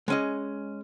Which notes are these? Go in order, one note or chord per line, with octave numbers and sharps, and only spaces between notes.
G#3 C#4 D#5